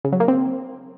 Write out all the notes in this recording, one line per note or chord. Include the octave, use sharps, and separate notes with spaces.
C#3
F#3
A#3
C4